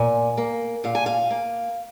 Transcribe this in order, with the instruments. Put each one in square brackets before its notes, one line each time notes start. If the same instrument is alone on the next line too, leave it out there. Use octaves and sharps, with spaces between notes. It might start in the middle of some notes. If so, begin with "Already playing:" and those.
Already playing: [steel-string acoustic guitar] A#2 G#5
A#3
A#2 F5
G#5
F5
A#3